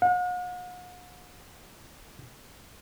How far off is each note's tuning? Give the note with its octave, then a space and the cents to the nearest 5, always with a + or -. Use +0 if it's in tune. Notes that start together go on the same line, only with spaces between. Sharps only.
F#5 -45